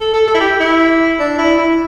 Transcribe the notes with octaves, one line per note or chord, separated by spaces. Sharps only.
A4
A4
A4
E4
G4
E4
D4
E4
E4